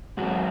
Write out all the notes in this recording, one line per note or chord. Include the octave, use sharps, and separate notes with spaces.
G#2 F#3 F#4